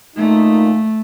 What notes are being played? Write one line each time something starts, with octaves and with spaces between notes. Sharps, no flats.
A#2 A3 D#4